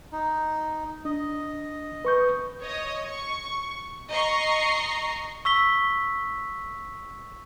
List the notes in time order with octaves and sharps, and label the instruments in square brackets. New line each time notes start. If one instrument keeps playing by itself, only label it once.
[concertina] D#4
[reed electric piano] D4 [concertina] D#5
[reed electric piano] B4 C#6 G6
[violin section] C#5 D#5 D#6
C#6
D#5 A#5 C#6 C7
[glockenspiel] C#6 E6 B6 G7